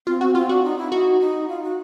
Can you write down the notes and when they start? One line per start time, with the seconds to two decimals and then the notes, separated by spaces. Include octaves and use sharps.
0.07 C4 F4
0.21 C4 F#4
0.35 C4 F4
0.49 D4 F#4
0.63 D#4
0.78 E4
0.92 D#4 F#4
1.20 D#4
1.48 F4
1.63 F#4